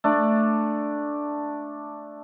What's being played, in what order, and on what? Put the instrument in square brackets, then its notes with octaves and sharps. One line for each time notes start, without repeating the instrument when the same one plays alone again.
[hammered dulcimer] A3 D4